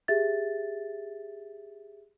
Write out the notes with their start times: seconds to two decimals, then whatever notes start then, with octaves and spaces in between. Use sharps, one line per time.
0.08 G4 G#4 E5 A6